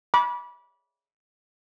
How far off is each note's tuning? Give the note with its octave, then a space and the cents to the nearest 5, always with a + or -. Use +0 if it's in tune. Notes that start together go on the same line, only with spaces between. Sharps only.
B5 -25 D6 -25